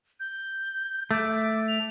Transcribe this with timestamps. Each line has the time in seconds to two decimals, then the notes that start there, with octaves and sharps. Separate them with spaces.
0.20 G6
1.11 A3 D6
1.68 F7